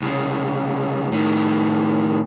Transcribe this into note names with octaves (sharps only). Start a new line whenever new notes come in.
C2 C#3
A2 D#3